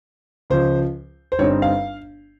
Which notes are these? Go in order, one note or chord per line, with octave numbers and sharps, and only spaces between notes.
C#2 C#3 F3 C5
C5
G1 G2 G3 C4 D#4 C#5
F5